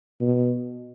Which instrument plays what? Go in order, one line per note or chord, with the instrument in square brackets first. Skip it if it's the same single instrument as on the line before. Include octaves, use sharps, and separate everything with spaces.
[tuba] B2